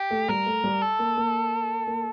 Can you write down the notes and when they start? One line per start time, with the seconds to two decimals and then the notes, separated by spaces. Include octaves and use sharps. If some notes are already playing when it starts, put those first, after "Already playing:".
Already playing: G4
0.11 A3
0.29 G3 A#4
0.46 A3
0.64 G3
0.82 A4
0.99 A#3
1.17 A#3
1.87 A#3